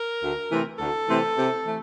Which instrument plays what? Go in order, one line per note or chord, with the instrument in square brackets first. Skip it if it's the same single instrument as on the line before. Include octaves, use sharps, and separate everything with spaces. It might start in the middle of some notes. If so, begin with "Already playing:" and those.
Already playing: [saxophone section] A#4
D2
C3 E3 A3 C4
D2 A4
C3 E3 A3 C4
C3
E3 A3